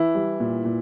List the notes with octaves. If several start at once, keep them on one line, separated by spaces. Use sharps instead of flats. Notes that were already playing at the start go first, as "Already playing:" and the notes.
Already playing: E3 E4
G3
A#2
A#2